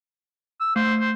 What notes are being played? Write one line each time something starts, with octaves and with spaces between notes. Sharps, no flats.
E6
A3 C5
C5